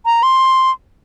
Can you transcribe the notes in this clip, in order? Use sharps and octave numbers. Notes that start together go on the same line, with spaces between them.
A#5
C6